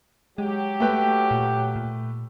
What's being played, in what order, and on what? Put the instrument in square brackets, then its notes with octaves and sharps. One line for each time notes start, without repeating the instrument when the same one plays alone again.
[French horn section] F#3 G4 [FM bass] G#3
[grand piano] A3 B4 G5
[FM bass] A#2
A#2